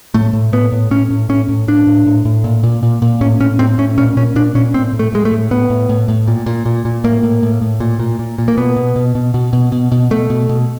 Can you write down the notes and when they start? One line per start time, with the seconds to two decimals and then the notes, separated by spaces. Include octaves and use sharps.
0.14 A2 A3
0.33 A2
0.53 A2 B3
0.72 A2
0.91 A2 C#4
1.10 A2
1.29 A2 C#4
1.49 A2
1.68 A2 D4
1.87 A2
2.06 A2
2.25 A2
2.44 A#2
2.63 A#2
2.83 A#2
3.02 A#2
3.21 A2 C#4
3.40 A2 C#4
3.59 A2 C4
3.78 A2 C#4
3.98 A#2 C#4
4.17 A#2 C#4
4.36 A#2 D4
4.55 A#2 C#4
4.74 A2 C4
4.93 A2
4.99 A3
5.12 A2 G#3
5.25 A3
5.32 A2
5.51 A2 B3
5.70 A2
5.89 A2
6.08 A2
6.28 A#2
6.46 A#2
6.66 A#2
6.85 A#2
7.04 A2 A#3
7.23 A2
7.43 A2
7.62 A2
7.80 A#2
8.00 A#2
8.19 A#2
8.38 A#2
8.48 A#3
8.57 B2 B3
8.77 B2
8.96 B2
9.15 B2
9.34 B2
9.53 B2
9.72 B2
9.92 B2
10.11 B2 A3
10.30 B2
10.49 B2